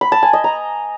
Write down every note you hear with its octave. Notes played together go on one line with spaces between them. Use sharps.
B5
A5
G#5
D#5
A#5